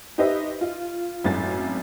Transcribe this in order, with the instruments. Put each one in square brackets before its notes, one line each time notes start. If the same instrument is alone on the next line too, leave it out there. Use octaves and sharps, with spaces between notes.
[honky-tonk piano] D#4 G4 B4 C5 D#5 E5
F4
G#1 F#2 A2 A3 G#5 A6